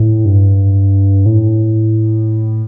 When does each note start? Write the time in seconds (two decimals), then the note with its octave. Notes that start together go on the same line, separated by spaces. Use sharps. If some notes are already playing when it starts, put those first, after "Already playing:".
Already playing: A2
0.25 G2
1.26 A2